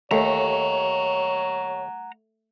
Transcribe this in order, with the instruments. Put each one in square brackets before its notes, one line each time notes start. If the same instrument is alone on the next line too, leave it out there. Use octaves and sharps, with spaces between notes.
[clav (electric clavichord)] D#2 [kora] A3 [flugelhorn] C#5 [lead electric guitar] F#5 A#5